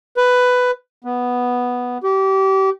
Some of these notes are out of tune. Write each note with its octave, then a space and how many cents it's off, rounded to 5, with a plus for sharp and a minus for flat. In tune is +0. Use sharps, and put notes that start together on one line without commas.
B4 +10
B3 -5
G4 -30